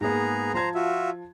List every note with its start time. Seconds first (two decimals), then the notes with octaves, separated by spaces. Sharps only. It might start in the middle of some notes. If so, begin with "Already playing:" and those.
0.01 G#2 G#3 A#3 B3 G#4 A#5
0.54 F3 C5 A5 A#5 G#6
0.75 F4 F#4 E5